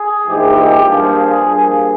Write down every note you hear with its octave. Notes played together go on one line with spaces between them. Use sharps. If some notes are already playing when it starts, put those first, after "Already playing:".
Already playing: G#4
A#1 G#2 E3 G#3 G4
G2 F3 A#3 G#4
G2 F3 A#3